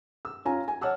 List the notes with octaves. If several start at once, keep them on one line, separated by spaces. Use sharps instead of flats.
E6
C#4 F4 G#5 A#5
G#5
C#5 F#5 A5 E6 F6